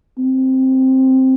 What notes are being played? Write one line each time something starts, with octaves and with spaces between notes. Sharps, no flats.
C4